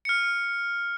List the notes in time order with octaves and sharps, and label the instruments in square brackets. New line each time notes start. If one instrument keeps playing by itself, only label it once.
[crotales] F6 C#7